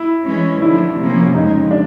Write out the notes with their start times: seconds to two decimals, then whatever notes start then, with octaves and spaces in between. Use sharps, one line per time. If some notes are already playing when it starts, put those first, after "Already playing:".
Already playing: E4
0.25 E3 G#3 C#4
0.62 D3 F3 A3 E4
0.98 C3 F3 A#3 C#4
1.34 F2 C#3 F3 G#3 D#4
1.71 D4